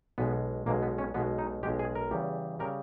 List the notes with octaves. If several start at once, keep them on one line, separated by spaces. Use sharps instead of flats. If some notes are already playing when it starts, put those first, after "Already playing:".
B1 B2 G#3 B3
B1 B2 G#3 A#3
B3
C#4
B1 B2 G#3 B3
D#4
B1 B2 G#3 G4
G#4
A#4
E2 C#3 G3
C#3 G3 A#4